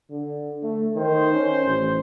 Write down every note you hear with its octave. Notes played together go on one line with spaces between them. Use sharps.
D3
A3
D#3 C5
C#4
A1